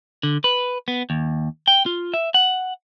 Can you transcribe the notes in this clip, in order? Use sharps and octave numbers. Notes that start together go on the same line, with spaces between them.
D3
B4
B3
D#2
G5
F4
E5
F#5